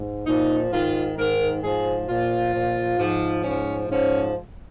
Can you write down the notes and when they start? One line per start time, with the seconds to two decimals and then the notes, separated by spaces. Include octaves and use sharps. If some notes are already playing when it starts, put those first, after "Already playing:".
Already playing: G#2
0.25 A#2 F3 D#4
0.70 G#2 D#3 F4
1.16 G#2 D#3 A#4
1.62 G#2 F3 G#4
2.07 A#2 F3 F4
2.52 A#2 F3
2.98 G#2 F3
3.44 G#2 F3 C#4
3.88 G#2 F3 C#4